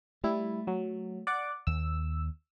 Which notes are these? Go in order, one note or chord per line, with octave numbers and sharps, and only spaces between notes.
G3 A3 E4
F#3
D5 F#5 D6
D#2 E6